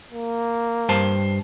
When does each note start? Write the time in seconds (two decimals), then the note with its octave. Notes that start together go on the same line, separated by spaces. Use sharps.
0.11 A#3
0.89 G2 C5 A5